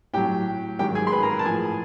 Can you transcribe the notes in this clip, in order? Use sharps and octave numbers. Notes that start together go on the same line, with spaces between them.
A2 F#3 G4 G5
G#2 D#3 F#3 G4 G5
G#4 G#5
C6
B4 B5
A#4 A#5
A5
A2 F3 G#4 G#5